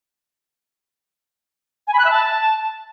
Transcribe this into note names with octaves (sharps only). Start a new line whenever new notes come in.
G#5
B5
F#6
E5
A5